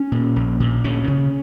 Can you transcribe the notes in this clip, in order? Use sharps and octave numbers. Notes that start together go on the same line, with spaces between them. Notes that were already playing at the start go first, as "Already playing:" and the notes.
Already playing: C#4
A#2
A#1
A#2
D2 C#4
C#3